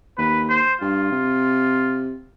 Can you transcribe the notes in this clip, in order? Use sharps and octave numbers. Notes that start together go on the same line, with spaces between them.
D#2 B4
C5
G2 F4
C3